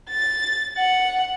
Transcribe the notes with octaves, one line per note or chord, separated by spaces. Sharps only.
A6
F#5